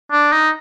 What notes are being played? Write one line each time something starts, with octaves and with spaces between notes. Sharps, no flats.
D4
D#4